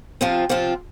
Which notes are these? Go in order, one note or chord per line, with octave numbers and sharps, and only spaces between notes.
C3 F3 C4 F4
C3 F3 C4 F4